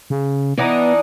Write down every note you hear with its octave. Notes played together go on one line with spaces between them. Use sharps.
C#3
E3 B3 D4 D#4